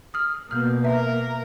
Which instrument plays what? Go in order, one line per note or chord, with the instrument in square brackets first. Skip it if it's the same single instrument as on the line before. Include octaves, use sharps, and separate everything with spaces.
[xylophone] D#6 F6
[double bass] B2 A#3 [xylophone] F6 G6
[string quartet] A#4 [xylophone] B4 E5